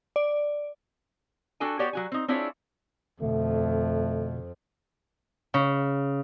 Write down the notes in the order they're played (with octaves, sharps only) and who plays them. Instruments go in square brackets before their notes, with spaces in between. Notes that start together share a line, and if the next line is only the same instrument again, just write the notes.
[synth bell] D5
[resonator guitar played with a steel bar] D4 F#4 A4 G5 G#5
B3 F#4 G4 C#5 D5 G5
F#3 F#4 G#5
C4 D#4
C4 D4 E4 F4 G#4 C#5
[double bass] F2 [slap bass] B2 D3 [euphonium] A3
[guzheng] C#3